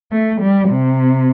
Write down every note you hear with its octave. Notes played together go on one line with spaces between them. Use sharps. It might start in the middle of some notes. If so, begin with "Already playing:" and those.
A3
G3
C3